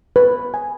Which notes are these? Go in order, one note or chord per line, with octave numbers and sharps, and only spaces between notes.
B4
G#5